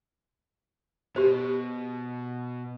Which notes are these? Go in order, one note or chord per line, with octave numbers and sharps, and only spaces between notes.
B2 G4 C5